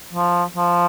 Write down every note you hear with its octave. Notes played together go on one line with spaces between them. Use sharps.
F3
F3